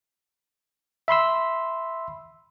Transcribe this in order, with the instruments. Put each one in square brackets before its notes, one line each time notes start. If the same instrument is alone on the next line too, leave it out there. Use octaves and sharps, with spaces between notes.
[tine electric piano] E5 B5 C6 E6